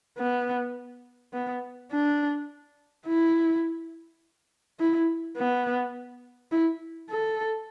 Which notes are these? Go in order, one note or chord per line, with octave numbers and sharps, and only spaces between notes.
B3
B3
D4
E4
E4
B3
E4
A4